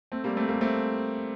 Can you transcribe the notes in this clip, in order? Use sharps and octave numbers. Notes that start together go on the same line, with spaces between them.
A3 C4
G3 A#3
A3 C4
G3 A#3
A3 C4